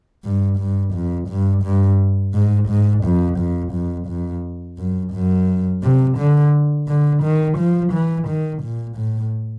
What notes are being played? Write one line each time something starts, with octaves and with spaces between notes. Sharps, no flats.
G2
G2
F2
G2
G2
G#2
G#2
F2
F2
F2
F2
F#2
F#2
C3
D3
D3
D#3
F3
E3
D#3
A#2
A2